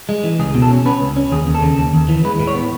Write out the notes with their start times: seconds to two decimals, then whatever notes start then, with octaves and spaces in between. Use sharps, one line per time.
0.09 G#3
0.23 E3
0.39 C#2 G#4
0.55 B2
0.62 A4
0.70 C#4
0.85 C#4 B4
1.00 C#2
1.16 C#4
1.32 D#2 G#4
1.47 D#2
1.54 A4
1.62 C#3
1.78 D#2
1.94 D#2
2.09 E3
2.24 G#3 B4
2.40 A2
2.47 C#5
2.54 B3